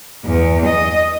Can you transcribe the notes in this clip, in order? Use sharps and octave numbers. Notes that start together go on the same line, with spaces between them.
E2
D#5